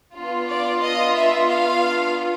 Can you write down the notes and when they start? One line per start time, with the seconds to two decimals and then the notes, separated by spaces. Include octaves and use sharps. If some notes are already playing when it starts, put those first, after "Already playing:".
0.16 B3 D4 F4
0.49 D5
0.82 D#5
1.15 E5
1.49 F5